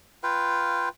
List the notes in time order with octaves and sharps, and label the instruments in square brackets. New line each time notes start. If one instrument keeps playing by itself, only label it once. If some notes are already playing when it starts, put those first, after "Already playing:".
[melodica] F4 B4 F5 G5